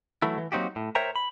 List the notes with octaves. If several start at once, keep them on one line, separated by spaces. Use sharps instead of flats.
E3 F#3 A3 E4
E3
F#3 A#3 C4 D#4 F#4 G4
A2
A#4 C5 C#5 E5 G5 A#5
B5